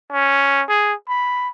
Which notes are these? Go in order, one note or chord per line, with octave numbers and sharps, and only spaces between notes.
C#4
G#4
B5